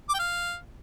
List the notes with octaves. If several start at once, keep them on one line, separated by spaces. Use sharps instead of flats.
D6
G5
F5